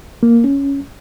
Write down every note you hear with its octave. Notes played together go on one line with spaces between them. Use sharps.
A#3
C#4